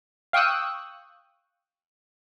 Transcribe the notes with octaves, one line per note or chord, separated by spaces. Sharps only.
F5 G5 C#6 D#6 E6 F#6